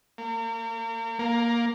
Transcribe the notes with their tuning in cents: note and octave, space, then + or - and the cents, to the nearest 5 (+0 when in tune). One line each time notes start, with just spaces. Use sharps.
A#3 -35
A#3 +10